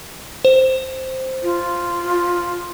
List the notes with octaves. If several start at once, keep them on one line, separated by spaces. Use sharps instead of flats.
C5
F4